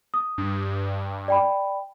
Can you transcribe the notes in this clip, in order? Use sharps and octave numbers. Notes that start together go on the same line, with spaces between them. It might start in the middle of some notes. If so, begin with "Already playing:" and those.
D#6
G2
D5 G5 B5